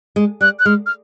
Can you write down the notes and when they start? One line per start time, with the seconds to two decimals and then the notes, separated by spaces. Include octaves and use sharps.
0.16 G#3
0.41 G3 F#6
0.59 F#6
0.65 G#3 F6
0.86 F6